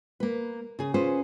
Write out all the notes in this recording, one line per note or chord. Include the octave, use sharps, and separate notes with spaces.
A#3 B4
C#3 G#4
C#4 F4 G#4 B4 C5